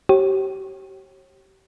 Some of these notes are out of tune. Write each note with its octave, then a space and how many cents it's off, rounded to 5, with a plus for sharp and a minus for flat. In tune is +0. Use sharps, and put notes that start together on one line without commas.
G4 -30 C#5 -35